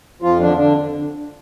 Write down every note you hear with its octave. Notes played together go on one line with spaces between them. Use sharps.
F2 F3 F4
D3 D4
D3 D4